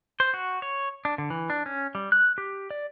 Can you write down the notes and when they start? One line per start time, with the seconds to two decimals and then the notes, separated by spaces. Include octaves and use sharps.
0.20 C5
0.34 F#4
0.62 C#5
1.05 D4
1.18 D3
1.30 E3
1.50 D4
1.66 C#4
1.95 G3
2.12 F#6
2.38 G4
2.71 D5